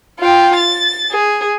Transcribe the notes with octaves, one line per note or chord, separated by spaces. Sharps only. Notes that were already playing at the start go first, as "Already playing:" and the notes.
F4 G5
A6
G#4